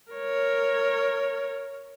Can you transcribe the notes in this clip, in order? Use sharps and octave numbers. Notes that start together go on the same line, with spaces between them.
A#4 C#5